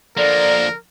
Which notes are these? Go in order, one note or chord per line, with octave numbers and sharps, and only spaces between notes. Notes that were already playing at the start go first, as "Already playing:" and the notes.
D3 F3 A#3 A#4 D5